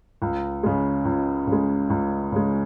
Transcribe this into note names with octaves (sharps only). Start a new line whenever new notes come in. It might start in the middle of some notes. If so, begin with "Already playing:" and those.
C#2
C#3 G#3
C#2
C#3
G#3
C#2
C#3 G#3